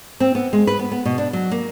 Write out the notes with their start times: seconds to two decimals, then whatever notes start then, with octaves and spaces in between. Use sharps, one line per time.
0.20 C4
0.35 B3
0.53 G#3
0.67 B4
0.79 B3
0.92 B3
1.05 B2
1.18 D4
1.33 F#3
1.51 A#3